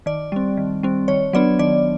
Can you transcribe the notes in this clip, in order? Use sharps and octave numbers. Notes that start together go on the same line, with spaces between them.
D#3 D5
G3 C4
D#3
G3 C4
D#3 C#5
F#3 B3 D4 D5
D#3 D5